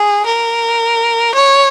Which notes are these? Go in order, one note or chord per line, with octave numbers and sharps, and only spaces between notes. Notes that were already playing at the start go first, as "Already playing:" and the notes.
Already playing: G#4
A#4
C#5